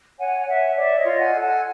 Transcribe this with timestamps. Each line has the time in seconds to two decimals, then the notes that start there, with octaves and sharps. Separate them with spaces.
0.19 C#5 F#5 G#5
0.47 C#5 E5 F#5
0.76 C#5 D5 E5
0.98 C#5 D#5
1.05 F4
1.19 F#5 G#5
1.34 A4
1.41 F#5 G#5